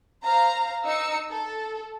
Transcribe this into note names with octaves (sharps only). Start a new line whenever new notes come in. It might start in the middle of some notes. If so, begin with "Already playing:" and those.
C5 F5 A#5
D#4 E6 C#7
A4